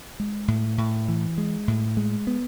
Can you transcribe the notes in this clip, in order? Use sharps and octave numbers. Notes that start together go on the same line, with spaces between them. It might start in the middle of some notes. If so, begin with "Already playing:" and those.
G#3
A2
A2
E3
G#3
A2
G#3
B3